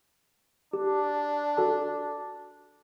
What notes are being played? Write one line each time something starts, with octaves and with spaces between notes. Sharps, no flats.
D4 G4
F#4 A4 A5